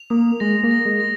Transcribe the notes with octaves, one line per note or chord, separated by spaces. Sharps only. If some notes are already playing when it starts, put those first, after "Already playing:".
Already playing: F7
A#3 D#6
G#3 A#6
A#3
A#6
G#3
A#6